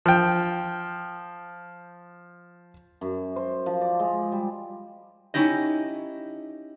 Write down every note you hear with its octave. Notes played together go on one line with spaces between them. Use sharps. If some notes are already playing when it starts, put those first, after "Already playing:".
F3 G5
F#2
C5
F3
D5
G#3
G3
C#4 D#4 E4 G4 D#5